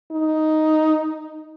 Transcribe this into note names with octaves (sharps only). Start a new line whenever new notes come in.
D#4